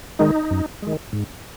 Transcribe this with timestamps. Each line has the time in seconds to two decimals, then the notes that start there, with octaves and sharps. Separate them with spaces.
0.19 D#3 G#3 D#4
0.51 F#2
0.82 D#3 G#3
1.13 G#2